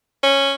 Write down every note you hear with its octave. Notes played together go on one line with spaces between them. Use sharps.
C#4